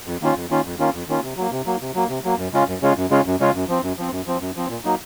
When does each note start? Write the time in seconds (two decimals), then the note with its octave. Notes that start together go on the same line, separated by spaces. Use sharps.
0.07 F2
0.22 D#3 A#3 C#4 F4
0.36 F2
0.50 D#3 A#3 C#4 F4
0.65 F2
0.79 D#3 A#3 C#4 F4
0.94 F2
1.08 D#3 A#3 C#4 F4
1.23 C3
1.37 F#3 A#3
1.51 C3
1.66 F#3 A#3
1.81 C3
1.95 F#3 A#3
2.09 C3
2.24 F#3 A#3
2.38 F#2
2.53 C#3 G#3 C#4 F4
2.68 F#2
2.82 C#3 G#3 C#4 F4
2.96 F#2
3.10 C#3 G#3 C#4 F4
3.26 F#2
3.40 C#3 G#3 C#4 F4
3.55 F#2
3.68 F3 C4
3.83 F#2
3.98 F3 C4
4.11 F#2
4.27 F3 C4
4.41 F#2
4.56 F3 C4
4.69 A#2
4.85 F#3 A#3 D#4